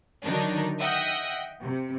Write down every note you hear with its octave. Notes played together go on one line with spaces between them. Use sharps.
D3 D#3 F#3 D4 D#4
D#5 E5 F#5 G5 D#6
C3